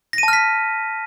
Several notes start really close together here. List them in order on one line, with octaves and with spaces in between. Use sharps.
A#6 D#7 A5 F6 B6